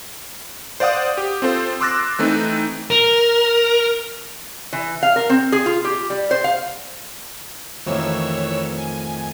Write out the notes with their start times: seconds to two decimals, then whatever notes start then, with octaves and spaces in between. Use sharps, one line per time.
0.80 C5 D5 F5 F#5 D#6
1.17 G4
1.42 C4 F4 A4 C5
1.81 C6 D6 E6 F#6 A6 A#6
2.19 E3 A3 C4 D#4
2.90 A#4
4.73 E3
5.03 F5
5.16 A#4
5.30 C4
5.52 G#4
5.66 F4
5.85 G4
6.10 G3
6.31 C5
6.44 F5
7.86 F2 A2 D#3 E3 C#5 E6
8.78 G#5